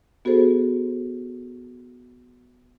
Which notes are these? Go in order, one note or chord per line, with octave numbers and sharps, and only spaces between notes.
B3 F#4 G#4 A4 C5